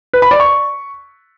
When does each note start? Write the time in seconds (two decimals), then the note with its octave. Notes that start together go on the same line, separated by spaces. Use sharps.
0.13 B4
0.22 B5
0.31 D5
0.40 C#6